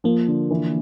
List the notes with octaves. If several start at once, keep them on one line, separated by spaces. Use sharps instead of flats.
F3 A#3
D3
E3